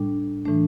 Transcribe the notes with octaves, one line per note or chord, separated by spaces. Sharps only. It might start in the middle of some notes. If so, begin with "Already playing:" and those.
Already playing: A2 G3 D4
A2 E3 A3 D4